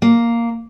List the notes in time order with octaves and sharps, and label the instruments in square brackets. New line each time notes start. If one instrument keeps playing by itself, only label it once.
[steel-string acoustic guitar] A#3